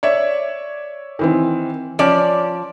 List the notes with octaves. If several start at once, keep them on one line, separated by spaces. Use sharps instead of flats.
C#5 D5 E5
D#3 E3 C4
F3 C#4 D5